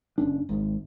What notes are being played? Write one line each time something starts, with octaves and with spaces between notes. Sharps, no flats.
F#1 C#4 D4
G#1 G#2